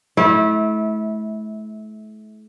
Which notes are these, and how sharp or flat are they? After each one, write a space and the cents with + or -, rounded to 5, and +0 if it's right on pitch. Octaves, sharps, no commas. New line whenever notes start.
A3 -35 E4 -20